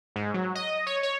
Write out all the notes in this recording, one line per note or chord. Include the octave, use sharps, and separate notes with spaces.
G#2
F#3
D#5
C#5
C#5